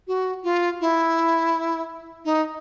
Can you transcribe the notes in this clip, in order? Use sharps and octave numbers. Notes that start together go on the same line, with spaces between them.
F#4
F4
E4
D#4